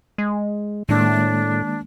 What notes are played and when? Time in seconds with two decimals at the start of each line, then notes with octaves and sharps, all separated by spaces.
0.18 G#3
0.89 A2 D#3 G#3 A#3 D4